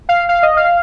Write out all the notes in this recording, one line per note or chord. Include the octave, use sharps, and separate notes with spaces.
F5
F5
D#5
F5